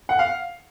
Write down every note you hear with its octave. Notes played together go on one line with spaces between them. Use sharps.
F#5
F5